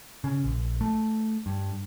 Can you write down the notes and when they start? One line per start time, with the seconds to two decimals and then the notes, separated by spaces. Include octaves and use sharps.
0.24 C#3
0.44 A#1
0.81 A3
1.46 G2